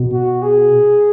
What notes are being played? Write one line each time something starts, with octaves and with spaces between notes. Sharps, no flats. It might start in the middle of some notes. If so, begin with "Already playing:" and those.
Already playing: B2
F#4
G#4